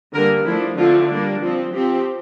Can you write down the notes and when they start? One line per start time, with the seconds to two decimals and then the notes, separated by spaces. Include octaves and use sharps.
0.13 D3 G3 A#3 A#4
0.46 F3 A3 D4 E4
0.77 D3 F3 A3 C4 F4
1.08 G3 A#3 D4
1.41 F3 C4
1.72 F3 C4 G4